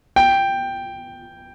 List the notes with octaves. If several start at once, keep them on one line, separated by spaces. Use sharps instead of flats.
G5